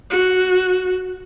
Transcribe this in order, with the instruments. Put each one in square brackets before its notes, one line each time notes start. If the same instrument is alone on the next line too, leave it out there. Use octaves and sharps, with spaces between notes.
[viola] F#4